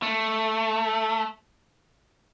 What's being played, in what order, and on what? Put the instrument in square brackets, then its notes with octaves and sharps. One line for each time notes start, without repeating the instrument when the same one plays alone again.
[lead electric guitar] A3